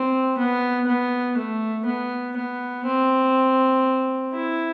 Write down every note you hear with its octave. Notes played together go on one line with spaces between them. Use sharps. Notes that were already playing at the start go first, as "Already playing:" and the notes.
Already playing: C4
B3
B3
A3
B3
B3
C4
E4